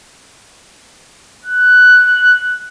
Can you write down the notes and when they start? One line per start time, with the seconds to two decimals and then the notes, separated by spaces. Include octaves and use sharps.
1.44 F#6